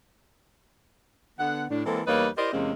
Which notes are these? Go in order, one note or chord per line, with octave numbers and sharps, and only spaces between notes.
D3 B3 F#5
A2 D4
E3 G#3 A#3 C4 A4
E2 G3 A#3 D#4 B4 C#5
E4 G4 A#4 C5 D5 D#5
E2 C3 G#3 A#3 C4 C#4